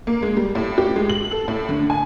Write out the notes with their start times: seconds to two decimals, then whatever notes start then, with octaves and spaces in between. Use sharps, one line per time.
0.07 A#3
0.22 G#3
0.37 G3
0.55 A2
0.78 G4
0.96 G#3
1.10 F#7
1.31 A4
1.48 A2
1.69 D3
1.90 G#5